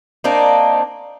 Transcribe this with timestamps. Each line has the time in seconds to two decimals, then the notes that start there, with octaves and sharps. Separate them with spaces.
0.24 A#3 C4 D4 D#4